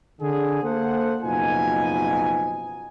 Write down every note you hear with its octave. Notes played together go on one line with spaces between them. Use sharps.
D3 G#4
A#3 A4 C5 F#5
F#1 B2 F3 D#4 F4 G#5